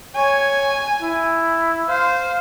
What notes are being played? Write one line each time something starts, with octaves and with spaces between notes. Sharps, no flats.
C#5 G#5
E4
C5 F5